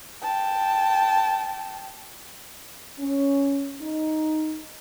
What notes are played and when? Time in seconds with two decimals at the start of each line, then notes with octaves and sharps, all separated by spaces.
0.23 G5 A5
2.99 C#4
3.81 D#4